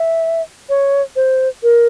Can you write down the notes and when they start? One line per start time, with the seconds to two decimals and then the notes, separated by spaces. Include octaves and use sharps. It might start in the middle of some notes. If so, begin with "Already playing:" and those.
Already playing: E5
0.69 C#5
1.16 C5
1.63 A#4